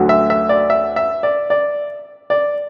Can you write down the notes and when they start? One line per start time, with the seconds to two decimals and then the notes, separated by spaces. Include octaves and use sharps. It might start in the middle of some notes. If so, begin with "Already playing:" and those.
Already playing: D2 D3 F#3
0.09 E5
0.30 E5
0.49 D5
0.70 E5
0.96 E5
1.23 D5
1.50 D5
2.30 D5